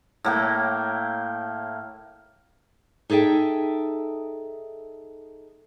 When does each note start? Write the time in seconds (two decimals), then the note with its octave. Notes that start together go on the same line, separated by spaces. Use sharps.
0.24 A2 A#3 G5
3.10 D#4 G#4 A4 E5 G5